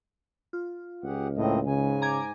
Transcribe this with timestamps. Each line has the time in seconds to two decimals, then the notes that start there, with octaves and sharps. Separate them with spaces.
0.53 F4
1.03 C#2 G4 G#4 F#5
1.37 A2 A#3 C4 D#5
1.67 G#2 C#3 G#5
2.02 A#5 D6 G#6